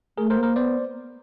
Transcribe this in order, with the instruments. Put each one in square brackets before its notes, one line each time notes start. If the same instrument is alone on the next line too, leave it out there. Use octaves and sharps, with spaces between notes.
[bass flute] A3 [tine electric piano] G#4 A#4
[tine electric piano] A#4 C5
[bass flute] A#3
[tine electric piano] A#4 C5
[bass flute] B3 [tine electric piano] C5 D5